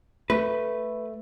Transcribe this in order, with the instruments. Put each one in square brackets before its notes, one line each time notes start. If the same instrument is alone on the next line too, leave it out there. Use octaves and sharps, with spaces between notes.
[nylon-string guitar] A3 [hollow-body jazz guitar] B4